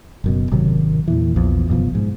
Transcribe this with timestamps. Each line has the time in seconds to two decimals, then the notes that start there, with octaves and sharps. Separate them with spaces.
0.24 F#1 F#2 B2
0.51 G#1 C3 D#3 F#3
1.08 E2 A#2 E3
1.36 A#1 E2 E3 F3
1.68 D1 F#2 B2 F3
1.95 G#2